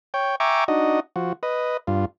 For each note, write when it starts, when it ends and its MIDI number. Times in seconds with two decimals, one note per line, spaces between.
0.14 0.36 73
0.14 0.36 79
0.40 0.64 76
0.40 0.64 79
0.40 0.64 80
0.40 0.64 82
0.40 0.64 85
0.40 0.64 86
0.68 1.00 62
0.68 1.00 63
0.68 1.00 66
0.68 1.00 75
1.16 1.33 53
1.16 1.33 66
1.43 1.77 71
1.43 1.77 75
1.87 2.05 43
1.87 2.05 65